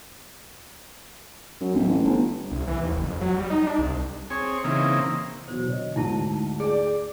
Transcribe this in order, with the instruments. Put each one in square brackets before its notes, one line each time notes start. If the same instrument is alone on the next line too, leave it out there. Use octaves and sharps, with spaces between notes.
[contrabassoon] F#2
D1
A1
G1
[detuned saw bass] C2
E3
D#2
F#1
F2
F#3
G3
D#4
D4
C2
[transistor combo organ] C4 G#4 C#5
C#3 E3 A#3 C4 D#4
[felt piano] E2 B2 F#3 [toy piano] C5
[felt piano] D3 C#5 D#5
[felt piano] D2 G#2 D3 [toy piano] D#4 E4 A5
[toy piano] G#4 [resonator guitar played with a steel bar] D5 G5